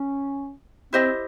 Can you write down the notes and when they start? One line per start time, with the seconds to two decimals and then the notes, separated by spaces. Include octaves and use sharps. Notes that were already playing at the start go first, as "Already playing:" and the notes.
Already playing: C#4
0.93 C4 E4 G4 C5 D#5